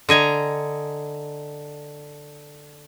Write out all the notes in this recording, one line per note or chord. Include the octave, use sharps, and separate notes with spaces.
D3 D#5 G#5 A#5